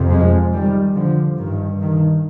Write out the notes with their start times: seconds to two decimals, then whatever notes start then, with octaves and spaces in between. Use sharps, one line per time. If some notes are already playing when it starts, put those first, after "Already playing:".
Already playing: F2 C3
0.10 F3 G#3
0.52 D#3 G3
0.95 D3 F3
1.38 G2 D#3
1.81 D#3